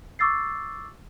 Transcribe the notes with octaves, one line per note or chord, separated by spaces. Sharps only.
C#6 D6 E6 A6 C7